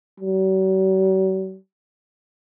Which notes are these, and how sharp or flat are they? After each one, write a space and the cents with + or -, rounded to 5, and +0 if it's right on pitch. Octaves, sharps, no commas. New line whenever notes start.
F#3 +45